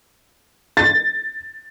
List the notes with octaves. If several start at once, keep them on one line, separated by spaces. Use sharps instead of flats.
A6